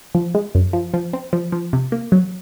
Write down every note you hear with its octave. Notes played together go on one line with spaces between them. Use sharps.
F3
G#3
F#2
F3
F3
C4
F3
F3
C3
A#3
F#3